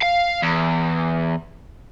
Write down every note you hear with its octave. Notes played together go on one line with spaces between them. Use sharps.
F5
E2